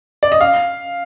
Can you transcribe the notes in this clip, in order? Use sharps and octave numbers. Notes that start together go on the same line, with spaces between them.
D5
D#5
F5